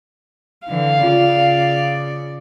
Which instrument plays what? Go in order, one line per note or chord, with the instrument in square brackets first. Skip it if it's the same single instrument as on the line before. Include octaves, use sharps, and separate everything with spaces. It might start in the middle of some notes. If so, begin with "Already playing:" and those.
[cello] D3 E3 [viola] F5
[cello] C#3 D5 [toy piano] F4